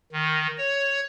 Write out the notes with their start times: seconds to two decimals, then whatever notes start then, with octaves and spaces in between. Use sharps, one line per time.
0.12 D#3
0.58 C#5